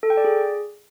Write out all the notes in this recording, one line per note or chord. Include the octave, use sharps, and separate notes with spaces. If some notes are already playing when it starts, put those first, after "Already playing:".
A4
G5
D5
G#4